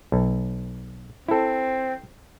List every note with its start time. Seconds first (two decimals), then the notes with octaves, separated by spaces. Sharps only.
0.12 B1
1.28 C4 E4 A4